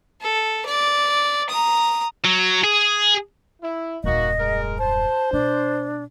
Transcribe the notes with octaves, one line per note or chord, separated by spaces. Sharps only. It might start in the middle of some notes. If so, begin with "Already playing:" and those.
A4
D5
A#5 D#6
F#3
G#4
E4
D#1 F#2 A#3 D#4 F#4 D#5
G#3 A#4
C5 A5
B2 D4